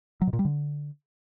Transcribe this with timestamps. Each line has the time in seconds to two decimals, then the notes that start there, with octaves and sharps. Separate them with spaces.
0.21 F#3
0.27 B2
0.33 A#2
0.39 G3
0.45 D3